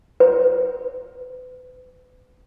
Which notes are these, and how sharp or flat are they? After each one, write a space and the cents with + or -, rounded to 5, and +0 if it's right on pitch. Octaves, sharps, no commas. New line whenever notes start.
B4 +35